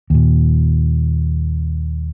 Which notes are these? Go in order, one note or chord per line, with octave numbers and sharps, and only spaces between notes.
D#2 A#2